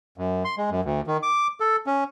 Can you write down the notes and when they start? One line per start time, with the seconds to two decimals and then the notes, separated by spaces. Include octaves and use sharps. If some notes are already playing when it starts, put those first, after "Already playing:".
0.18 F#2
0.45 C6
0.58 G#3
0.70 F#2
0.85 D2
1.07 D#3
1.23 D6
1.60 A4
1.87 C#4